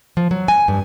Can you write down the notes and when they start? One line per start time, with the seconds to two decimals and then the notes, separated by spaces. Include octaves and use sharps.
0.17 F3
0.31 F#3
0.48 G#5
0.68 G2